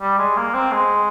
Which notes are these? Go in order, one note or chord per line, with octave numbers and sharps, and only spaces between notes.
G3
G#3
A#3
C4
G#3